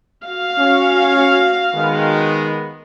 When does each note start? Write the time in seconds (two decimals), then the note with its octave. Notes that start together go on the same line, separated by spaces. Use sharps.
0.24 F#4 F5
0.58 C#4 C#5
1.74 D#3 G#3 B3